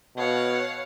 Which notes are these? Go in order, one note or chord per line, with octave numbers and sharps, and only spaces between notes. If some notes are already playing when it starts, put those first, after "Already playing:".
B2 C#5 F5 F#5